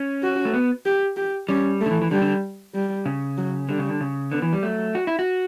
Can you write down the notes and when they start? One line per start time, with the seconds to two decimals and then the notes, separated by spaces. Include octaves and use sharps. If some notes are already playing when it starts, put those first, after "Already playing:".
Already playing: C#4
0.23 F#4
0.45 A3
0.53 B3
0.85 G4
1.17 G4
1.49 G3 C#4
1.81 A3
1.86 D3
1.91 E3
2.02 E3
2.11 D3 G3
2.22 D3
2.74 G3
3.06 C#3
3.37 F#3
3.69 D3 G3
3.79 C#3
3.89 D3
4.01 C#3
4.32 D3 B3
4.42 E3
4.53 G3
4.63 F#3 A3
4.95 F#4
5.07 E4
5.19 F#4